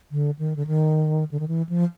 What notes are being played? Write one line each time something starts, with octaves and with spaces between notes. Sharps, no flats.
D3
D#3
D3
D#3
D3
D#3
E3
F3